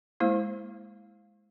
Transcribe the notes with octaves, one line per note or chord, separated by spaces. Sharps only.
G#3 A#3 E4 C5